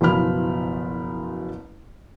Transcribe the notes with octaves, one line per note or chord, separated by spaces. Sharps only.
F#1 B2 F3 E4 B5 F6